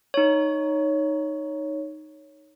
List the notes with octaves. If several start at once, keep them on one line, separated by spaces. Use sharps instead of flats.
D#4 C#5